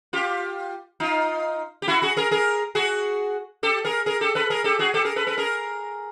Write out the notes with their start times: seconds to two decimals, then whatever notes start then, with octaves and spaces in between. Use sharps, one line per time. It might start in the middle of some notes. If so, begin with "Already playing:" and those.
0.13 F4 G4
1.00 D#4 F4
1.82 G4
1.88 E4 F#4
2.02 F#4 G#4
2.17 G#4 A#4
2.31 G#4 A#4
2.75 F#4 G#4
3.63 G4 A4
3.85 G#4 A#4
4.06 G#4 A#4
4.21 G4 A4
4.35 A4 B4
4.50 G#4 A#4
4.64 G4 A4
4.79 F#4 G#4
4.94 G4 A4
5.05 G#4 A#4
5.16 A4 B4
5.27 A4 B4
5.38 G#4 A#4